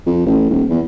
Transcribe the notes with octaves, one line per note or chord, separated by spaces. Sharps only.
F2
A1
D#1
E2